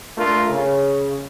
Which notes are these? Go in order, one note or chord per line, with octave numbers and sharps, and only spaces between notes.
A3 D4 F4 A#4
C#3